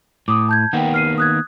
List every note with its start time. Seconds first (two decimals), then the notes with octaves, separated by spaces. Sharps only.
0.28 A2 D6 D#6
0.49 A5 G6 G#6
0.73 D#3 A#3 B3 F#5 G5
0.94 F6 C7 D#7
1.18 D#6 F#6 G#6